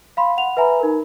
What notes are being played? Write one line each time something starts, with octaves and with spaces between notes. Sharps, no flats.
F5 B5 C6
F#5 F7
B4 E5 G#5 A#5 B5
D#4 A#4